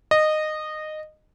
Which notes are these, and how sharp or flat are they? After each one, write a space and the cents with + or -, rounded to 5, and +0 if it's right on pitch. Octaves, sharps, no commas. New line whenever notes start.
D#5 -15